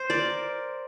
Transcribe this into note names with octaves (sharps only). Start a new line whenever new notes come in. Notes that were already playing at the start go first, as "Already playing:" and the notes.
Already playing: C5
A#4 D5